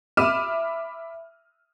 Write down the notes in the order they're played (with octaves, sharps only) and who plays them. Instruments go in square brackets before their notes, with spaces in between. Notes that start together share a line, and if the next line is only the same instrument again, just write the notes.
[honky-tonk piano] E5 B5 D6 F6 D#7 E7